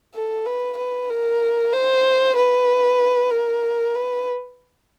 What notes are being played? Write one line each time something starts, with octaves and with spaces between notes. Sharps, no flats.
A4
B4
B4
A#4
C5
B4
A#4
B4